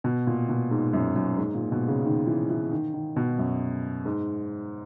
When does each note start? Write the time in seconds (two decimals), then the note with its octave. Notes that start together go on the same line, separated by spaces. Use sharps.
0.04 B2
0.27 A#2
0.49 B2
0.71 G#2
0.93 F#2
1.16 F#2
1.38 G#2
1.55 A#2
1.72 B2
1.88 C#3
2.05 D#3
2.27 E3
2.50 E3
2.71 D#3
2.94 D#3
3.16 B2
3.38 F#2
4.05 G#2